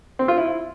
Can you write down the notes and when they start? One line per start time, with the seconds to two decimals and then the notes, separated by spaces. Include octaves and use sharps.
0.19 C4
0.28 F4
0.37 E4